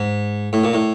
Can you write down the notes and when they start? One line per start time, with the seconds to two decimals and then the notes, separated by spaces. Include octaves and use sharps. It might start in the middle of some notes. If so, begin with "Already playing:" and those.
Already playing: G#2
0.53 A2
0.64 A#2
0.74 A2